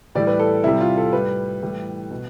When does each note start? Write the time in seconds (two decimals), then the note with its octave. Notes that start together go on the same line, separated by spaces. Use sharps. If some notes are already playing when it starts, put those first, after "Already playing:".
0.15 A2 E3 G3 D5
0.27 B4
0.39 A4
0.64 C3 G3 E4
0.81 F4
0.97 A4
1.13 A2 G3 B4
1.62 A2 E3 G3
2.10 B2